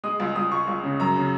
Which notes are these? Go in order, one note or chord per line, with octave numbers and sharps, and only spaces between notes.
G#3 D#6
C#2
C#2 D#6
C#2 C#6
C#2
C#3
F#2 A#5
C#3